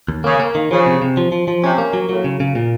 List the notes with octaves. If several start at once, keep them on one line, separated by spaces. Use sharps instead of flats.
D#2
C#3 A#3
A#3
D#3
C#3 F3
C3
C3
F3
F3
F3
C3 C#4
A#3
F#3
A2 F#3
C#3
C#3
A#2